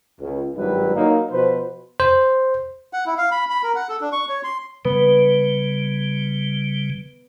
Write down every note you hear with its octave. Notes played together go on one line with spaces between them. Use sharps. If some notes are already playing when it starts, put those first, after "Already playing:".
C#2
G#1 G2 F#3 G3 E4 B4
F#3 A#3 D#4
B2 F3 B4 C5
C5
F#5
E4
F5
B5
B5
A#4
F#5
A4
D4
C#6
C#5
C6
C#3 G3 B3